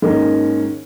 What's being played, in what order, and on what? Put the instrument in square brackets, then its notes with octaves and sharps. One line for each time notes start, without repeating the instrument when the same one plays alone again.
[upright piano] G#2 D#3 A#3 C#4 D#4